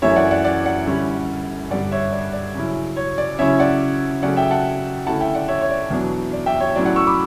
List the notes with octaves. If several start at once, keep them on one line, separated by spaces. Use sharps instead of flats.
F#2 E3 A3 E4 C#5 E5
D5 F#5
D5 F#5
D5 F#5
D5 F#5
D3 G3 C#4 E4
G2 D3 G3 D5 F#5
C#5 E5
D5
D5
C#3 F#3 C#4 E4
C#5
D5
C#3 F#3 C#4 E4 C#5 E5
D5 F#5
C#3 F#3 A3 D5 F#5
E5 G5
F#5 A5
D3 A3 C#4 E4 F#5 A5
E5 G5
D5 F#5
C#5 E5
C#5
D5
E2 B2 F#3 B3 D4
D5
E5 G5
C#5
A2 F#3 C#4 E4 D5
D5 F#5
C#6 E6
B5 D6